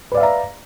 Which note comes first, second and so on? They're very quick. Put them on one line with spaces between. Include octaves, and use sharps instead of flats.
B4 D5 F5 E5 A#5